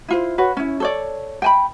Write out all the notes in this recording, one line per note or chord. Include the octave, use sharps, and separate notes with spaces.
E4 F4 C5
F#4 B4 C#5
C#4 E4
A4 C#5 D5
G5 G#5 B5